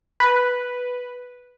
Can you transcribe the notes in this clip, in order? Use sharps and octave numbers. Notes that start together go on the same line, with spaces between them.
B4